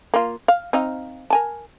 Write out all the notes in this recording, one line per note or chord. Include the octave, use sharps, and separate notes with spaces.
A#3 F4
F5
C4 D#4 F5
A#4 G#5 A5